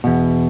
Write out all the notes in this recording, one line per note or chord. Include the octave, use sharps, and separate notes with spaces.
E2 B2